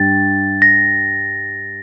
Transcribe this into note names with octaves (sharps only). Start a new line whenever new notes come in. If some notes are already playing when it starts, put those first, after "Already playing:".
Already playing: G2 A6
A#6